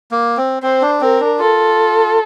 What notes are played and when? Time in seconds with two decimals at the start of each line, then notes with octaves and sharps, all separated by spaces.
0.11 A#3
0.37 C4
0.63 C4 C5
0.82 D4
1.01 C4 A#4
1.20 D4
1.39 F4 A4